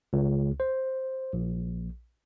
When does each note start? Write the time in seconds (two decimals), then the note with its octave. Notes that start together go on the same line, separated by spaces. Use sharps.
0.13 C#2
0.60 C5
1.33 A#1